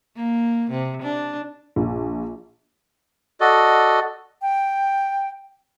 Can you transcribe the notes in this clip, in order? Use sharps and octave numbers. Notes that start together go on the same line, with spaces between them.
A#3
C3
D4
A#1
F#4 A4 D5 D#5
G5